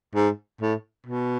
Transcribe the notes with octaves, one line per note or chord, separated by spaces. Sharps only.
G#2
A2
B2